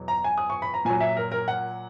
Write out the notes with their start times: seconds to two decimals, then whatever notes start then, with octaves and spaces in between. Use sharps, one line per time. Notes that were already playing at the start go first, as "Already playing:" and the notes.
Already playing: E2 B2 F#3
0.08 A#5
0.24 G#5
0.38 D#6
0.50 C#6
0.62 B5
0.74 A#5
0.85 A#2 F#3 G#5
1.00 E5
1.17 A#4
1.32 A#4
1.48 F#5